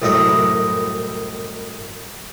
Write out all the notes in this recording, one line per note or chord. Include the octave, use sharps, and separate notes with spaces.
C2 F#2 A2 E4 D#5 C#6